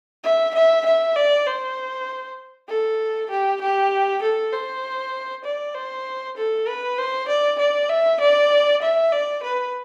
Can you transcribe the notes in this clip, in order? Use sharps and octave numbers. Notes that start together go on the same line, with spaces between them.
E5
E5
E5
D5
C5
A4
G4
G4
A4
C5
D5
C5
A4
B4
C5
D5
D5
E5
D5
E5
D5
B4